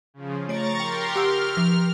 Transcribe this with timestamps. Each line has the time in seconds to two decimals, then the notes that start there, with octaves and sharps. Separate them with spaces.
0.14 C#3 F3
0.48 A3 C#5 A#5 C#6 A6 D7
0.80 G4 A#4 G5 C6
1.16 G4 F#5 E6 F6
1.57 F3